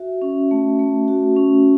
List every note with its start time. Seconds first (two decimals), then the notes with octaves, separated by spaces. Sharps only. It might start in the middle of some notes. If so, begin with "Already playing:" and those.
Already playing: F#4 E5
0.22 C#4
0.51 A3
0.79 A3
1.08 F#4
1.37 C#4